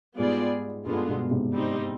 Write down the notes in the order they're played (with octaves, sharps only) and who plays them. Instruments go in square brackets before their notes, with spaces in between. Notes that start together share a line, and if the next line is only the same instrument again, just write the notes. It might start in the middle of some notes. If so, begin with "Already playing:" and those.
[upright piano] G#2 [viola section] G3 B3 F4 G#4 D5
[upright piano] G2 [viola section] D3 G#3 B3 F4
[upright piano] G2 B2
G#2 C3
[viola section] G3 C4 D#4